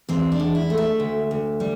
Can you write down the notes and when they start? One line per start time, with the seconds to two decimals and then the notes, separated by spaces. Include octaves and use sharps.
0.09 E2 C4
0.32 D4
0.40 E2
0.55 E4
0.70 A3
0.78 E5
1.00 D2
1.31 D2
1.60 G3